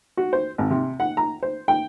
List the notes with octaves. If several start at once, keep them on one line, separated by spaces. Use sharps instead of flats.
F#4
C5
G#1
C3
F#5
A#5
C5
G5